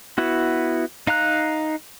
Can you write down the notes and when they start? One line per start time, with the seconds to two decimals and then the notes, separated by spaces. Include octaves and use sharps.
0.18 B3 E4 F#4
1.07 D#4 F5 A#5 F#6